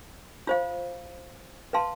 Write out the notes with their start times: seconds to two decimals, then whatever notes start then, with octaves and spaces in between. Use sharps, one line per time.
0.47 F4 C5 F5
1.73 B4 F5 A5 C6